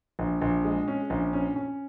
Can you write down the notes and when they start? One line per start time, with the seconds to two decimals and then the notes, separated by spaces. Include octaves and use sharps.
0.19 A#1
0.42 A#1
0.65 G#3
0.88 C#4
1.10 A#1
1.33 C#4
1.56 C#4